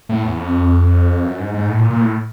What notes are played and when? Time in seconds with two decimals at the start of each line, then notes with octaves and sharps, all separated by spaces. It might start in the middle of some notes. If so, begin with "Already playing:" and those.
0.09 A2
0.23 E2
0.38 F2
1.25 F#2
1.39 G#2
1.54 G#2
1.69 A2
1.79 A#2
1.90 A#2
2.01 A2